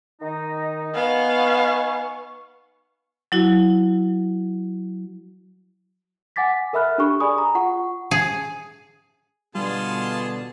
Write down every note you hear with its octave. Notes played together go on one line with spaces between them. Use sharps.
D#3 D#4
B3 D#4 F5 G#5 C#6
F#3 E4 F#4
F#5 G#5 D6 A6 B6
A4 A#4 E5 B5 F6 F#6
D4 G4 A4 B5 C#6
G#4 D5 G#5 B5 D#6
A#5
F4 F#5 C#6
G#4
B2 D3 G3 B3 F4 G#4 A5